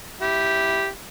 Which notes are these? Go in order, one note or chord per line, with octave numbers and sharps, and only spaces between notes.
E4 G4